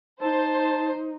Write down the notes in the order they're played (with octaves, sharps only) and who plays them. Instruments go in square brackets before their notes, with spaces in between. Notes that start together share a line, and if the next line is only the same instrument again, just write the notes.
[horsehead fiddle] D#4 [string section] C5 [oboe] A5